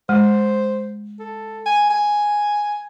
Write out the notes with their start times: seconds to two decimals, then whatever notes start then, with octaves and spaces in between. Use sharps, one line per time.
0.09 G#3 C5
1.20 A4
1.66 G#5
1.90 G#5